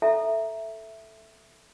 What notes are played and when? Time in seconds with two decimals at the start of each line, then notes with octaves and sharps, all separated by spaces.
0.02 A4 E5 A#5